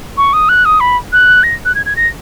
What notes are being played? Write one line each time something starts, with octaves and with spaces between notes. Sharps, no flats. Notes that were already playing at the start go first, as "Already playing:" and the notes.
C#6
D#6
F#6
D#6
B5
F#6
A#6
F#6
G#6
G#6
A#6